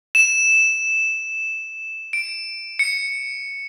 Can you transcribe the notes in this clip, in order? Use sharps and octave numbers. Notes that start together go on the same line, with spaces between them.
E7
D7
C#7